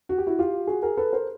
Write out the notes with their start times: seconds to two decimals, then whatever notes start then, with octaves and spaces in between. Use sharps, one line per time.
0.09 F#4
0.18 G4
0.27 E4 F#4
0.39 F4 G4
0.67 F#4 G#4
0.83 G#4 A#4
0.97 A4 B4
1.13 A#4 C5